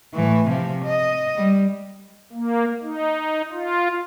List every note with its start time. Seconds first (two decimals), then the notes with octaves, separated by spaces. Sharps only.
0.14 A2 E3
0.49 C3 F3
0.85 D#5
1.37 G3
2.33 A#3
2.83 D#4
3.52 F4